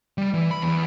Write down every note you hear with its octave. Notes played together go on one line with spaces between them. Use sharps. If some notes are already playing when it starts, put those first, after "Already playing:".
G3
E3
B5
E2